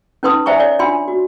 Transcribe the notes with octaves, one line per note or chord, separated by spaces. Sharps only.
C#4 D#4 B4 C6 D#6
C5 D5 E5 G#5 A#5 C#6
C#5 D5
D4 F4 G#5 C6
F#4